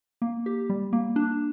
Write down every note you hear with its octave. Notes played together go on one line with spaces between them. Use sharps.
A#3
G4
G3
A#3
D4